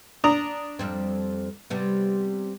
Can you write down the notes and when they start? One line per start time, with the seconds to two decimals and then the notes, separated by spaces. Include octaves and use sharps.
0.24 D4 A#5 D#6
0.79 F2 G3 C4
1.70 C3 G3 B3